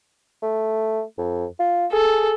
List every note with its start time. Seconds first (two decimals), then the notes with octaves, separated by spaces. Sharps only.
0.42 A3
1.18 F2
1.59 F4
1.93 G#4 A4